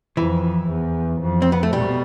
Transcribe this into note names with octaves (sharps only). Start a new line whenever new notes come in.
F2 E3
E2
F2
C4
B3
A3
B2 G3